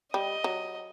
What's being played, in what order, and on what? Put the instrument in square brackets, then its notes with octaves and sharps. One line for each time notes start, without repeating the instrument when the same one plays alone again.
[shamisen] G3 [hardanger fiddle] D#5
[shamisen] F#3